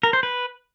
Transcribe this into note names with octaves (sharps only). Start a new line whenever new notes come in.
A#4
C5
B4